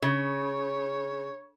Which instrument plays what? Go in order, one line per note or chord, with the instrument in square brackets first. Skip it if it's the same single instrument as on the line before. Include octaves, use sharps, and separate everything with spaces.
[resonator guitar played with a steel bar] C#3 [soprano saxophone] C#5